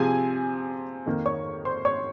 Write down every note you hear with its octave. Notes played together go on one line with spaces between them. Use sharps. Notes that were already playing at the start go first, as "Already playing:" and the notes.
Already playing: C3 F3 C4 G#4 G#5
F2 D#3 A#3
C#5 C#6
C5 C6
C#5 C#6